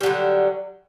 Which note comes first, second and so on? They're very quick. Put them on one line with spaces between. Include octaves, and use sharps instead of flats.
G3 F#3 D3